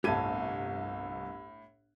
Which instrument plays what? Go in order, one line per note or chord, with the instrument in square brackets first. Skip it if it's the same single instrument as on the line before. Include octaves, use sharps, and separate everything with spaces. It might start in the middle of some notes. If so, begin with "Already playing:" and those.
[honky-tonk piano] G1 C2 [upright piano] A2 G#6 D#7 [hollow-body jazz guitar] G4 A5